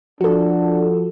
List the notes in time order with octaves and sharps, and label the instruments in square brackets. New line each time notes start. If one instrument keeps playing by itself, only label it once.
[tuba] F3 [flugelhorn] D4 [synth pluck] F#4 A4